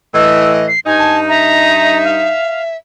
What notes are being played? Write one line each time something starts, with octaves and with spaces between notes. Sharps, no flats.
A2 E3 D#5 E6
C7
G2 D#4 G#5
A5
E5 A#5
F5